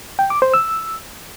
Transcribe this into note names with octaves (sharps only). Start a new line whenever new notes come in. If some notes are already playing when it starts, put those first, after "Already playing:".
G5
D6
C5
E6